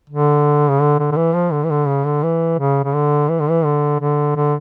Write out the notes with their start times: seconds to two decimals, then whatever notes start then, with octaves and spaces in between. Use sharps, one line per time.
0.10 D3
0.69 C#3
0.81 D3
0.99 D3
1.12 D3
1.16 E3
1.34 F3
1.52 D3
1.64 E3
1.70 D3
1.87 C#3
2.05 D3
2.23 E3
2.59 C#3
2.84 C#3
2.94 D3
3.29 E3
3.40 D3
3.49 E3
3.64 D3
4.00 D3
4.36 D3